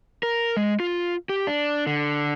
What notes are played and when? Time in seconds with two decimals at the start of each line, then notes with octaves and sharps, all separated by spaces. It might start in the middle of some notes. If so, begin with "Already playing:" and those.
0.23 A#4
0.57 G#3
0.80 F4
1.29 G4
1.47 D4
1.87 D3